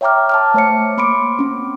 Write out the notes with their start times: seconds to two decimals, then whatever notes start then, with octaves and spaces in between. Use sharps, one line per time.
0.01 C#5 E5 G5 A#5 D6 F6
0.29 A5 D6 F6
0.54 A3 C5 C#5 E5 C#7
0.97 A#3 B5 C6 D6 D7
1.39 C4 C#4